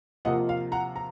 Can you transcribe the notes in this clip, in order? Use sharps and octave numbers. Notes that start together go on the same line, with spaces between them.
C3 F3 A#3 F4 D#5 F#5
F5
F#5 A#5
A#5